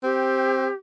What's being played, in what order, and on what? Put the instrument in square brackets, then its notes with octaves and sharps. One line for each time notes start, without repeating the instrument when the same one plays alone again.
[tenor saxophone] C4 [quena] G4